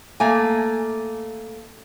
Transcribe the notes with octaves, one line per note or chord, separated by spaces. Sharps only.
A3 A#3 G#5